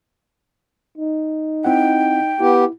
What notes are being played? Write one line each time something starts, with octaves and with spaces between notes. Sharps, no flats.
D#4
C4 E4 F#5 G5
B3 E4 G4